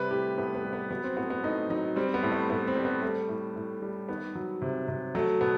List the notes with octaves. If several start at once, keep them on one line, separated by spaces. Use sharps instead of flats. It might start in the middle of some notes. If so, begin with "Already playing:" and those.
Already playing: C3 G3 B4
A2 G4
A2 B3
B3
G3
B3
F#3 B3
C4
A2 B3
B3
A2 D#4
F#3 D#4
G3 C4
B3
A2
A3
A2 B3
C4
G3
B3
G3 A3
A2
A2
G3
D#3 B3
F#3
C3
C3
F#3 A3
B2 B3